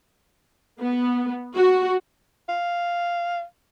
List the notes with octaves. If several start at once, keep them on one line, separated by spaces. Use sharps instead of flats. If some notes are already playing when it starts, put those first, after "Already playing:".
B3
F#4
F5